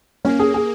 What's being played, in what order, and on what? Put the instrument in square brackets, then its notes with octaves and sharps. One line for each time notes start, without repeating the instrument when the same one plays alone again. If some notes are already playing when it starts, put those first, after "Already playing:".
[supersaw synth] A#3 [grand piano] C#4
[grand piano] G#4
G#4